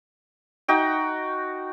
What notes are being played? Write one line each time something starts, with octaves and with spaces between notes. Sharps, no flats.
D#4 F#4 G5